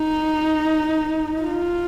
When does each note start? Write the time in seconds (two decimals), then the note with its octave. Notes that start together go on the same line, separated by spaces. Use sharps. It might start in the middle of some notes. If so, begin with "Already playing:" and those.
Already playing: D#4
1.42 F4